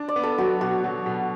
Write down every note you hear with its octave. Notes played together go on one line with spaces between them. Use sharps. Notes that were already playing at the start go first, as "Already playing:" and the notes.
Already playing: D4
D5
B3
A4
F#3 F#4
B2 F#4
F#3
B2